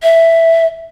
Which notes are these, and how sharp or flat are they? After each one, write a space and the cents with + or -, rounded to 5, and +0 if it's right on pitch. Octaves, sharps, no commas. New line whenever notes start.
E5 +0